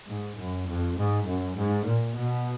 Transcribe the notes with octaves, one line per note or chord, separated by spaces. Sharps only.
G#2
F#2
F2
G#2
F#2
G#2
A#2
B2